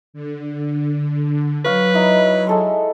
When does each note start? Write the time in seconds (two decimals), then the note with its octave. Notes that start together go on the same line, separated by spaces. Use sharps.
0.13 D3
1.65 F#3 B4 C#5 F5
1.94 D#4 E4
2.47 G#3 A4 C6